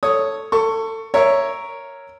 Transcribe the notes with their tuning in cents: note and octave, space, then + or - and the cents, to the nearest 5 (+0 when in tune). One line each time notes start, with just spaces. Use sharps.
A4 +5 C#5 +0 D#6 +0
A4 +25 C#6 +0
A#4 +0 C#5 +0 E5 +0